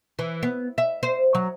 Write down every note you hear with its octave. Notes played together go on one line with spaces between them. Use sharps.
E3
B3
E5
C5
F#3